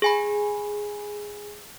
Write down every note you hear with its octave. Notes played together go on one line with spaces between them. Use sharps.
G#4 G#5 B5